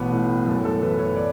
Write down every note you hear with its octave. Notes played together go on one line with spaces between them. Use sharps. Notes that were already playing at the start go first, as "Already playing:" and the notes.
Already playing: A1 B2 B3
A2
F#2 A4
A4
E3 B4
C#5
D5